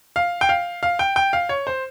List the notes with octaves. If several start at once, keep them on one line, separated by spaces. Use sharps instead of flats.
F5
G5
F5
F5
G5
G5
F5
C#5
C5